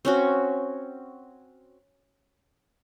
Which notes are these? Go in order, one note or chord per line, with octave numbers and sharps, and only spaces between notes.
C4 C#4 F#4